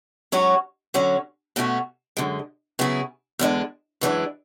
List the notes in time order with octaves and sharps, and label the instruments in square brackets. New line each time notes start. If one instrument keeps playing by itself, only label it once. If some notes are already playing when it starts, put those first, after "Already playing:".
[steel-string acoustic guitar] G#2 F#3 C#4 F#4 C#5
D3 F#3 C#4 F#4
B2 A3 C#4 F#4
F#2 D3 G#3
C#3 F#3 B3 E4 G#4
E2 D3 G#3 D4
F#2 E3 G#3 D4